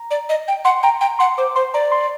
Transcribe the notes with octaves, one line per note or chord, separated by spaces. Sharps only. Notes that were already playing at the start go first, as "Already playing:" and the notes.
Already playing: A#5
D5
D#5
G5
F#5 C6
G5 A#5
G5 A#5
F#5 C6
C5 D6
C5 C6
D5 A#5
C6